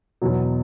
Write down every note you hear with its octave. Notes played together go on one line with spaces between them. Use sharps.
E2 B2 F#3